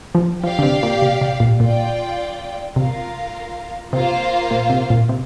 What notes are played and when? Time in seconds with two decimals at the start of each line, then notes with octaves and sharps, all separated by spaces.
0.15 F3
0.43 F3 G4 D5 F5
0.59 D3
0.63 C3
0.83 A#2
1.02 C3
1.21 C3
1.40 A#2
1.59 A#2 F4 D5 G5
2.76 C3 F4 A#4 F5
3.92 C3 A#3 F4 C5 F5
4.51 A#2
4.70 C3
4.90 A#2
5.09 C3